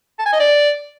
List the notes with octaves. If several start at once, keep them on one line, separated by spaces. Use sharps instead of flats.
A5
G#5
D#5
D5